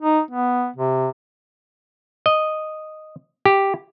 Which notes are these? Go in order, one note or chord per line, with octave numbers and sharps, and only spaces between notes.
D#4
B3
C3
D#5
G4